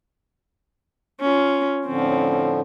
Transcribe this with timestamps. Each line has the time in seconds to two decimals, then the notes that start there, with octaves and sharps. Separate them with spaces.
1.21 C#4 F4
1.87 A2 D3 F3 C4 C#4